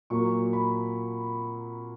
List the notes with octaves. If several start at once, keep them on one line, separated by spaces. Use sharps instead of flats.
A#2 F#3 A#3 C#6
B5